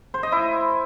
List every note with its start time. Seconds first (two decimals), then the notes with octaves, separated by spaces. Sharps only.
0.14 C5
0.23 D#5
0.32 E4